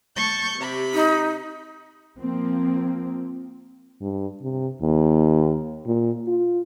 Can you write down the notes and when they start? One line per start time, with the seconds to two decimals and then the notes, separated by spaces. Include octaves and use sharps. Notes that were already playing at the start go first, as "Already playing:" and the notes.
0.16 A5 C#6 G6
0.58 C3 G4 B5
0.94 D#4
2.20 F3 A#3 C4
4.01 G2
4.42 C3
4.81 D#2
5.86 A#2
6.27 F4